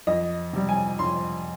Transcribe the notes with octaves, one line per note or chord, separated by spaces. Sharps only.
F2 D#5
C3 G3
G#5
F2 C6